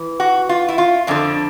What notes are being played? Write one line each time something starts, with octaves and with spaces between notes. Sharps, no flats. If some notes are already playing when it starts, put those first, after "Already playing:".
Already playing: E3
F#4
F4
E4
F4
F2 D3 D4